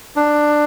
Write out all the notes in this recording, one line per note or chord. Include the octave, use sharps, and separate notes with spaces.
D4